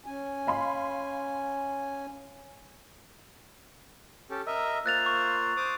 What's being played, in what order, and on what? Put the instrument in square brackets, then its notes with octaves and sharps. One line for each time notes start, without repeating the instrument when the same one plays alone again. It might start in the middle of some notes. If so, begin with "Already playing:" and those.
[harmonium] C#4 G#5
[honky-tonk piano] F5 B5 C6
[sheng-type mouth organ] C#4 G4 A4
[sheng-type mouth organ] A#4 D#5 E5 [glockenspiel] E6
[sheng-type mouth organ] A#3 F4 C5 [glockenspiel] F#6 A6 F7
[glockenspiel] C#6 A6
[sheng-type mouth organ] C5 D6 D#6